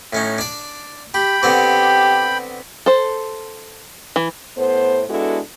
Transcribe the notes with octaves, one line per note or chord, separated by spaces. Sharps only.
A2 C#4 D#4
D4 D5
G4 G5 B5
D3 B3 C4 G4
A4 C5
E3
A2 B3 A4 C5
G#3 B3 D4 E4 F#4 A4